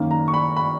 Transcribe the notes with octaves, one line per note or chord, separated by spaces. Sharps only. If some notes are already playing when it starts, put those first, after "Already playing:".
Already playing: F#2 D#3 A#3 C#4
A#5
C#6
B5
B5